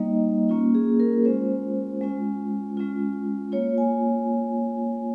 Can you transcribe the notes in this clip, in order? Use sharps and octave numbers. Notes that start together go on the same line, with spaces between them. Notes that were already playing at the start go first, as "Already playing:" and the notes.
Already playing: G3 A#3 D#4 D#5
A#3 C#4 F4
G#4
A#4
G#3 C#4 F4 C5
G#3 C#4 F4
G#3 C#4 F4
A#3 F4 C#5
G#5